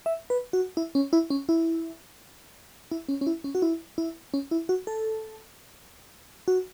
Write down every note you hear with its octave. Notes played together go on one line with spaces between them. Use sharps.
E5
B4
F#4
E4
C#4
E4
C#4
E4
E4
C#4
C#4
E4
C#4
F#4
E4
E4
C#4
E4
F#4
A4
F#4